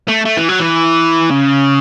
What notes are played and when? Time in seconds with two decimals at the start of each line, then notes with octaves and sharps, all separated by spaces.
0.08 A3
0.26 A3
0.37 E3
0.49 F#3
0.60 E3
1.30 C#3